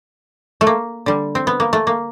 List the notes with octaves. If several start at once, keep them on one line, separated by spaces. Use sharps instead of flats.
A3
A#3
D3 G3
C4
B3
A#3
A3
A#3